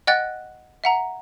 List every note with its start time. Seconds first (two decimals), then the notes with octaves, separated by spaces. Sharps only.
0.07 D#5 F#5 G5 F#6 A6
0.84 E5 F#5 A#5